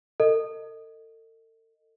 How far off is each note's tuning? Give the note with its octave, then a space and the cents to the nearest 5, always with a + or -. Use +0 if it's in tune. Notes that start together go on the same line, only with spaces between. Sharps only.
A4 +40 D#5 +0